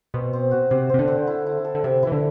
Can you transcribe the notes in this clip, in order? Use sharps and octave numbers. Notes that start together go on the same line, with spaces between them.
B2 C4
C4
F#4
C3 C5
C3 C4
D3
C4
E4
E4
A4
D3
C3 E5
E3 E4
D3